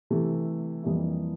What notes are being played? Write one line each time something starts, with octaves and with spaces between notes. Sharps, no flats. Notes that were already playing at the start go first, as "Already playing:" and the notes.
C3 E3 A3
F2 E3 G3 A#3 E4